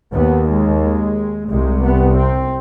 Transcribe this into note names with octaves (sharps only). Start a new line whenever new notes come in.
D#2 B3
G#3
G#3
C2 C3 G#3
B3
C4